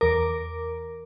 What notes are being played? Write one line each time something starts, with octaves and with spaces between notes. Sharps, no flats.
E2 A#4 D6